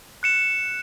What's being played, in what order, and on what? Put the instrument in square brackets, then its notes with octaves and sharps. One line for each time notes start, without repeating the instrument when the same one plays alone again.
[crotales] F#6 C#7 E7